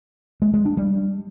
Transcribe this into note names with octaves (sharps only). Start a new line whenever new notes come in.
G#3
G#3
D4
G3